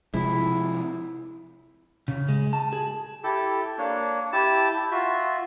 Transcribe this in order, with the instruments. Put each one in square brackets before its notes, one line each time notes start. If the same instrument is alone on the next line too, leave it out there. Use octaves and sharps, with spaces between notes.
[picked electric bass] C3 F3 G#3 [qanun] E4
[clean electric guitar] C#3
G#3
A5
G#4
[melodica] E4 G4 A4
A#3 D4 C#5
E4 G4 A5
E4
F4 F#4 E5